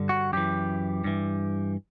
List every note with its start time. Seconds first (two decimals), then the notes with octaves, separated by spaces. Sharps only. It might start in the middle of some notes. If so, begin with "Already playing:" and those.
Already playing: G2 D3
0.09 F#4
0.33 F#2 E3 G4
1.04 G2 E3